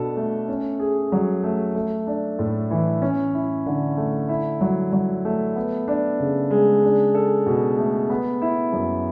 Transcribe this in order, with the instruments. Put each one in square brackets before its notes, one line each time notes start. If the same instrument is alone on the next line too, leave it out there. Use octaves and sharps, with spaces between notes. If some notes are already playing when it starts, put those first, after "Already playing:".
Already playing: [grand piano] B2 D4 A4
A3
C#4
G#4
F#3
A3
A3
D4
A2
E3
C#4
E4
D3
A3
E4
F#3
F#3
A3
B3
D4
C#3
G#3
D4
A4
B2
A3
B3
E4
F#2